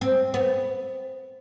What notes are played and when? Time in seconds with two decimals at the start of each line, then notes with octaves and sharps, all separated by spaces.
0.01 C4
0.34 B3